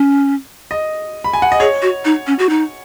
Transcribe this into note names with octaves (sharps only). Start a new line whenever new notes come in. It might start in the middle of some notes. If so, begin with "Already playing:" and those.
Already playing: C#4
D#5
B5
G#5
F#5
D#5
G#4 C#5
F#4
D#4
C#4
F#4
D#4